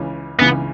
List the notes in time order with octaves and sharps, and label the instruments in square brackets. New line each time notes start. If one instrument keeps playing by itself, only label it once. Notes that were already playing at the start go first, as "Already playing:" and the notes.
Already playing: [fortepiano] C#2 C#3 E3
[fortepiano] C#2 C#3 E3 [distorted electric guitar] B3